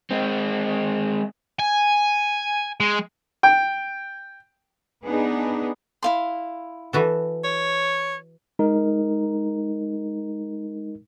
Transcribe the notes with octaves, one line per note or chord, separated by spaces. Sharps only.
G#3 C4
G#5
G#3
G5
B3 D4 D#4 G#4
E4 F5 C6
E3 F#4 A4
C#5
G#3 D#4 A#4